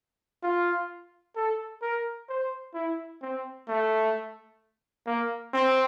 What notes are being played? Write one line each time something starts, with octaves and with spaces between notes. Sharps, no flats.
F4
A4
A#4
C5
E4
C4
A3
A#3
C4